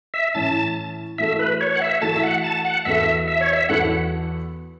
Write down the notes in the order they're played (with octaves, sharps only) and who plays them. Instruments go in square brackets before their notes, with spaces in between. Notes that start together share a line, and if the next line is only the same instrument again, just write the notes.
[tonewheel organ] E5
[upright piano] A2 E3 C#4 E4 [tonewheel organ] A5
[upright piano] E3 A3 F#4 A4 [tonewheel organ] E5
[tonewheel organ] B4
C#5
F#5
E5
[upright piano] E3 A3 F#4 A4 [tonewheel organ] A5
[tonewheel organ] E5
F#5
A5
F#5
[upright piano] E2 E3 B3 F#4 A4 [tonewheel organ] E5
[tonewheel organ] E5
C#5
E5
[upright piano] E2 E3 B3 F#4 A4 [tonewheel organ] F#5